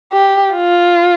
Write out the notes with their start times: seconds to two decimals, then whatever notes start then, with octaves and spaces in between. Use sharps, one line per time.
0.12 G4
0.54 F4